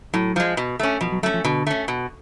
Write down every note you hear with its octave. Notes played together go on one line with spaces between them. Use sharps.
A2 F#3
F3 G#3
B2
A3 C#4
B2 F3
F#3
F#3 A3 C#4
F3
B2 D3
A3 C#4
B2